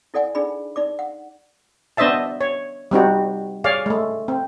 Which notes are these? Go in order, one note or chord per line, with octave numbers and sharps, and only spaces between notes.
E4 A4 D5 F#5 G#5
D4 D#4 G#4 D5 B5
D#4 D5 D6
F#5
B3 D4 C5 D#5 E5 A5
C#5
G3 C4 D#4 F#4
G#4 C#5 D5 F5
G#3 A3
C4